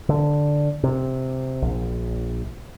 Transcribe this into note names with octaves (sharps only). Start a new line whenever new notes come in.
D3
C3
A#1